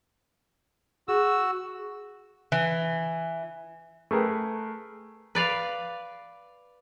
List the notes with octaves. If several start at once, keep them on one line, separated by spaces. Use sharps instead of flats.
F#4 G#4 E6
E3
A3 G#4 A#4 B4 G5
B4 D5 F5